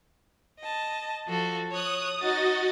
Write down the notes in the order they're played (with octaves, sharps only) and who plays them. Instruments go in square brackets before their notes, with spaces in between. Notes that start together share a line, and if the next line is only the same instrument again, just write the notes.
[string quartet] D#5 A5
F3 F#4 A4
[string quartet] C#5 F#6 [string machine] D#6
[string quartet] D#4 A6 [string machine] F#4 D#5